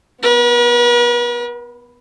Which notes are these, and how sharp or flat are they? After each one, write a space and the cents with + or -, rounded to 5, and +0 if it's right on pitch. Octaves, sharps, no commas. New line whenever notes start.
B3 +5 B4 -45